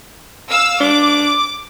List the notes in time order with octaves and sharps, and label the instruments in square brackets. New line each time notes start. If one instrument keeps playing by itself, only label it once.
[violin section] F5 E6
[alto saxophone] D4 [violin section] D6